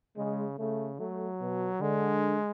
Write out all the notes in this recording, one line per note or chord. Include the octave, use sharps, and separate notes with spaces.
C#3 G#3
C#3 A3
F#3 A3
B2
D3 G#3